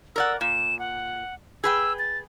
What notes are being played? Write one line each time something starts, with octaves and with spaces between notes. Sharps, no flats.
A#4 D5 F#5 E6
A#2 E7
F#5
G#4 B4 G5 E6
A6